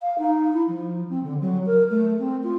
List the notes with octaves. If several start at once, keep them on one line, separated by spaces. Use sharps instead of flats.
F5
D#4
E4
F3
C4
D3
F#3
A#4
A3
C4
F4